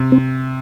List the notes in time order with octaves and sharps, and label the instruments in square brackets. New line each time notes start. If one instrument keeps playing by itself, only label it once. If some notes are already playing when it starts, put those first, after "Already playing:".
Already playing: [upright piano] C3
[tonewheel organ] C4